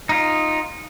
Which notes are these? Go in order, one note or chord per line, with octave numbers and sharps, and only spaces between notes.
D#4 F4